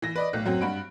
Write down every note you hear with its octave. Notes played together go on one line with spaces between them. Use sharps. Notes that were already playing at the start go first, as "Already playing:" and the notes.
E3 A#6
B4 D5 D#5
B1 A2 F#6
F#2 F#3 C4
G2 F#5 B5 D7